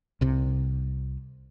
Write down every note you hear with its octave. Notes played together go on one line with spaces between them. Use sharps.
C2 C3